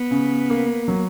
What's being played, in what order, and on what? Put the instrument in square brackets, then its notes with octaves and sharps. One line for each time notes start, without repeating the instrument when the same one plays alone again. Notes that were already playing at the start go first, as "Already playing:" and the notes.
Already playing: [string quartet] B3
[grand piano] C#3
A#3
F#3